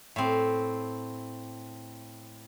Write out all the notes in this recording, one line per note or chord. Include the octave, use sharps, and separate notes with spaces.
A2 C4